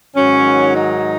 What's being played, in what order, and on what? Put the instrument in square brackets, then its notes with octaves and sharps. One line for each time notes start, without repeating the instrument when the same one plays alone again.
[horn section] G#2 D#3 F#3 C#4
D#4